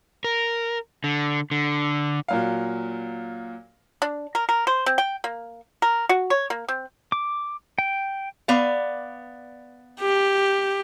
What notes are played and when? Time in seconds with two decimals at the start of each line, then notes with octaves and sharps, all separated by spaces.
0.24 A#4
1.04 D3
1.51 D3
2.28 A#2 F#3 F5
4.02 D4
4.35 A#4
4.49 A#4
4.67 C5
4.86 C4
4.98 G5
5.24 A#3
5.82 A#4
6.09 F#4
6.30 C#5
6.50 A#3
6.68 C4
7.12 D6
7.78 G5
8.48 B3 D5 F5
10.00 G4